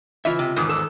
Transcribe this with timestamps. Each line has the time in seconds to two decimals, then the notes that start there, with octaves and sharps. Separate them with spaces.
0.25 C#2 E3 F4 E5
0.39 C3
0.56 E2 G#2 D#3
0.69 A4